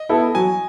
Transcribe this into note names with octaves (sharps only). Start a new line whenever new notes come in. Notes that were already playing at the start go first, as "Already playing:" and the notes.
Already playing: D#5
B3 E4 A4
F#3 G#5